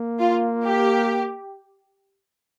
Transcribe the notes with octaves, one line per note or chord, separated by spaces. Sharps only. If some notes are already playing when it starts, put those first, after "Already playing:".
Already playing: A#3
F4
G4